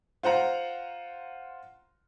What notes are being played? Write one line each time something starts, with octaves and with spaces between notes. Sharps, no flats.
F4 C5 F#5 A#5